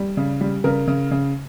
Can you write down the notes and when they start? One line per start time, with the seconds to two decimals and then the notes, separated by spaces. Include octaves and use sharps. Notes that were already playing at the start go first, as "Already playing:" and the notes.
Already playing: G3
0.17 C#3
0.41 G3
0.64 C#3 A#4
0.87 C#3
1.11 C#3